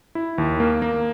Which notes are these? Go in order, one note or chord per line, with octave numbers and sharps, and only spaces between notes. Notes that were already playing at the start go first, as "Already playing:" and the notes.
E4
D#2
A#3
A#3